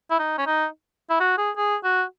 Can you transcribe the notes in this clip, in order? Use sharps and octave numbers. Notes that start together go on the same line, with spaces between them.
E4
D#4
C#4
D#4
E4
F#4
G#4
G#4
F#4